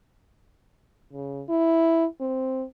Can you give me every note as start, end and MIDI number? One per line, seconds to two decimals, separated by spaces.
1.13 1.44 49
1.49 2.06 64
2.20 2.65 60